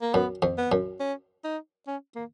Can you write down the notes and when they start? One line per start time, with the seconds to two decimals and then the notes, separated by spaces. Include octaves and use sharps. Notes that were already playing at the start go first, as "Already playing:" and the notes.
0.01 A#3
0.13 F#2 B3
0.42 F2
0.58 B3
0.72 F#2
1.00 C#4
1.44 D#4
1.87 C#4
2.15 A#3